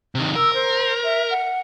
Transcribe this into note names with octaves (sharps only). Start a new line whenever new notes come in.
C3 D#3
A#4 E6
C5
E5
F#5